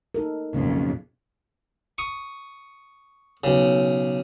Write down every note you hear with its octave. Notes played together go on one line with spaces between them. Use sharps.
D#4 A4 A#4
B1 F2 C#3 A#3
C#6 D#6
B1 C#3